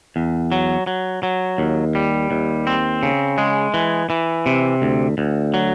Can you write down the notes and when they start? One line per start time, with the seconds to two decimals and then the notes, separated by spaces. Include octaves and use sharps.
0.16 E2
0.52 F#3
0.87 F#3
1.23 F#3
1.58 D#2
1.95 G3
2.31 D#2
2.67 C4
3.03 C#3
3.38 G#3
3.74 E3
4.10 E3
4.46 C3
4.82 D2
5.18 D2
5.54 F#3